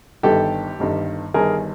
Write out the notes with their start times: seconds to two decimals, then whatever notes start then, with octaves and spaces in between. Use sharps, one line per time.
0.23 G1 G2 D#3 G3 G4 A4
0.79 G1 G2 D#3 G3
1.34 G1 G2 D#3 G3 G#4 A#4